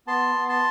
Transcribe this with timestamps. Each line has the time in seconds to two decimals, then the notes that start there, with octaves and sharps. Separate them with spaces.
0.07 B3 A5 C6
0.35 B3
0.48 A5 C6